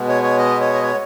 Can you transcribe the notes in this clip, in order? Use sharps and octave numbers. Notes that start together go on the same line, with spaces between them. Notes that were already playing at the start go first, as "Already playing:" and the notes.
Already playing: B2 G#3 B3
C#5
C#5
D#5
C#5
D#5
C#5